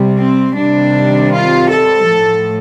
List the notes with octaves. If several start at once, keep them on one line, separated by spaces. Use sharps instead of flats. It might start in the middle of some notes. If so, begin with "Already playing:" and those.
Already playing: C3 G3
C4
C3 D#3 G3 D4
F4
A4
A2 F3